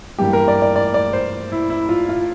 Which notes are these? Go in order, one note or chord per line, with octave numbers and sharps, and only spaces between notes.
G2 E3 G3 A#3 G4
A#4
D5
D5
D5
D5
C5
E4
E4
F4
F4